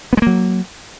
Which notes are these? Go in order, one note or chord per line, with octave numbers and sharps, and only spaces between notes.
F#3 G#3 A#3 B3